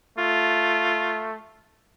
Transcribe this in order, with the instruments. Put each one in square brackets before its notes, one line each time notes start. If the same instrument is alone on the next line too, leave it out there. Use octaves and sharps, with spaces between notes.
[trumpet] A3 [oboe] F4